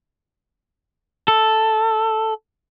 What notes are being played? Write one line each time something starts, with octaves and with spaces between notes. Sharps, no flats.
A4